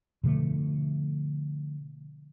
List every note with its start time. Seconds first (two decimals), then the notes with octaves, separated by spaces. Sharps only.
0.24 B2 D3 F3 A3